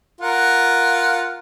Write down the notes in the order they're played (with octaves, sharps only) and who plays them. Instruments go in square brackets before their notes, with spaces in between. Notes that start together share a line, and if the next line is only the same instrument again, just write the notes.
[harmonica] F4 A#4 F#5